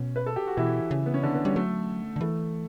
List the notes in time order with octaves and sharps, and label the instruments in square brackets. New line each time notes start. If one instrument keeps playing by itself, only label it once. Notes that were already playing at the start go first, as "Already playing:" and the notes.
Already playing: [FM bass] B2 [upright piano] C#4
[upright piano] B4
A4
G4
F#4
[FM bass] B2 [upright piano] E3 E4
[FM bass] C#3
[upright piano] B3
C#4
D3 D4
B3
[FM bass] G3 [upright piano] C#4
[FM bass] F#3 [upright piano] A3 A4
[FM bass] D3
[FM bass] E3 [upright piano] A3 A4